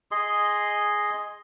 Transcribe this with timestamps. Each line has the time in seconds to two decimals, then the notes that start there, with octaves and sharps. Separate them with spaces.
0.11 G#4 D#5 C6